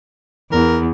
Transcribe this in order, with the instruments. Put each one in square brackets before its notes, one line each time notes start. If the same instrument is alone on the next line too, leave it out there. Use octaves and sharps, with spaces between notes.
[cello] E2 [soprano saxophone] A#4